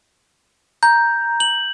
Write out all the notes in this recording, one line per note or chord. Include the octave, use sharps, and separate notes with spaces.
A#5 G6
F#7